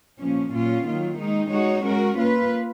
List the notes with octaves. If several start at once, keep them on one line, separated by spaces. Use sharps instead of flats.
A#2 F3 A#3 C#4
A#2 F#3 C#4 F4
D#3 F#3 A#3 F4
D#3 G#3 D#4
G#3 D#4 F#4 C#5
G#3 C#4 F#4 A#4
A#3 F4 B4